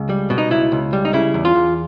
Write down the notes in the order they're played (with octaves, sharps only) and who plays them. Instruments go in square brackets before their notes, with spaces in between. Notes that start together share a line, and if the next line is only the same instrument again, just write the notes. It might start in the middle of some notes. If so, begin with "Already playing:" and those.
Already playing: [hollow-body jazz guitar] C#2
G3
B2
D#4
C#2 E4
C#2
G3
D#4
C#3 E4
E2
F4
E2